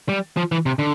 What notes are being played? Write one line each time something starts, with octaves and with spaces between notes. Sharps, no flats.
G3
F3
E3
C3
D3